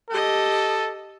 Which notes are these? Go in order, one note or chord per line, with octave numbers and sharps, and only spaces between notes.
G4 A4 D#5